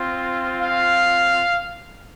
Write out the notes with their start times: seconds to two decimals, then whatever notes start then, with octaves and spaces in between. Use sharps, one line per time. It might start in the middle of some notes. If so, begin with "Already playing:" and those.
Already playing: C4 F4
0.57 F5